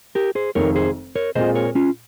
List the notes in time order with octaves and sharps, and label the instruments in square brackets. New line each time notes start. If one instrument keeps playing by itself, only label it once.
[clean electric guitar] G4 A#4
G#4 C5
[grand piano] F1 F2 D#3 G#3 [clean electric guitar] A#4 C#5
[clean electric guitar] G#4 C5
A#4 C#5
[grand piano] A#2 G#3 C4 F4 G#4 [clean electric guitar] C5 D#5
[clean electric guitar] A#4 C#5
C#4 F4